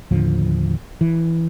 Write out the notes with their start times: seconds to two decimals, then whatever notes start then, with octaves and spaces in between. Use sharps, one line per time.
0.11 D#2 A2 D3 F3
1.01 E3